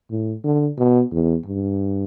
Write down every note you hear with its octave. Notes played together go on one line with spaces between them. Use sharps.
A2
D3
B2
E2
G2